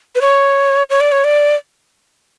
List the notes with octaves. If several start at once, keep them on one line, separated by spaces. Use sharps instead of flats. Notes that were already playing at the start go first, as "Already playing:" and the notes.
B4
C#5
C#5
D5
C#5
D5